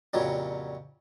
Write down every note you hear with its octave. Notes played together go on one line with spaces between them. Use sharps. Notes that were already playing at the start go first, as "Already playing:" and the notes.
F2 A#2 C#3 F#3 G3